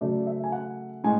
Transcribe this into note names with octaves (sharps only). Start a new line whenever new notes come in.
C#3 F#3 A3 D5
E5
G#5
F#5
A2 G#3 G#5